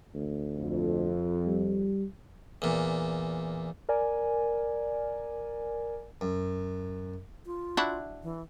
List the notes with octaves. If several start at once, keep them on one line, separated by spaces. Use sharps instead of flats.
D2
F2
G3
E2 A#2
A#4 D5 G#5
F#2
F4
D4 E4 F#4
E3